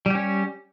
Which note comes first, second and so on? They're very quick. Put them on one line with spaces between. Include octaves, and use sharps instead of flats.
G3 G4 C#4